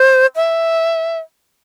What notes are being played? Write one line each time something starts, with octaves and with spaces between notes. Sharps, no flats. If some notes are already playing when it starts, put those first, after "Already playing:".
Already playing: C5
E5